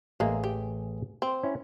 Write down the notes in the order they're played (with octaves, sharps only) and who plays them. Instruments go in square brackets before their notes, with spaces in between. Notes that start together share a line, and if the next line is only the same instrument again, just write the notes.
[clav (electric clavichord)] A1 G#4 E5 [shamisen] G#3 A#3
[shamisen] G4
C4
[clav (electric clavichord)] C#4 E4